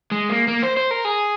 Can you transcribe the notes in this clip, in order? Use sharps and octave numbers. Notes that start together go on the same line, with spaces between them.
G#3
A#3
A#3
C5
C5
A#4
G#4